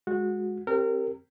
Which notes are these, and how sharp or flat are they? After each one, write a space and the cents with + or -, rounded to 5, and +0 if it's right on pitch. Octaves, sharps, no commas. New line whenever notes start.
G#3 +0 F#4 -20
C4 +20 G4 -10 A#4 -25